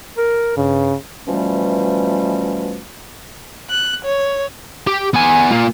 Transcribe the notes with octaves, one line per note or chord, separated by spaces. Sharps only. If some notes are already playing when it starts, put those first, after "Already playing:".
A#4
G2 C#3
B2 E3 F3 G3 A3 C#4
F#6
C#5
G4
B3 G#5
A#3 F4